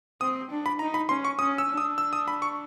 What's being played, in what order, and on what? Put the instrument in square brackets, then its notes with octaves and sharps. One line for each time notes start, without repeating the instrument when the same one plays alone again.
[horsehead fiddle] C4 [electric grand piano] D#6
[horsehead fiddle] D4
[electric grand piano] B5
[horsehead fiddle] D#4 [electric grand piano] A#5
[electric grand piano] B5
[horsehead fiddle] C#4 [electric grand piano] C6
[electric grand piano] C#6
[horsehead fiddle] C#4 [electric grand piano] D#6
[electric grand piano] E6
[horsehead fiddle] D4
[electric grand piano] D#6
E6
D#6
B5
C#6